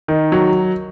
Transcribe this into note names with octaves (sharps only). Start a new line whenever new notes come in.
D#3
F#3